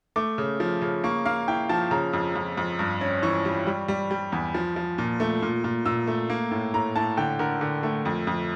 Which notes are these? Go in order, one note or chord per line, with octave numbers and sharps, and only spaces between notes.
A3 D6
C#3
F3
C#3
A#3 C#6
A#3 F5
E4 G5
F3 A5
C#3 A#5
F2
F2
F2
G2
C#4
E3 C#6
G3
G3
G3
G3
E2
F3
F3
A#2
A3
A#2
A#2
A#2 E6
A3
A#3
A2
A2 A#5
A2 A5
D3 G5
D3 A#4
D3
A3
F2
F2